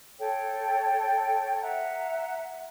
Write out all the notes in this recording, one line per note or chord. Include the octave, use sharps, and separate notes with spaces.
A4 C#5 G5
E5 F#5 A#5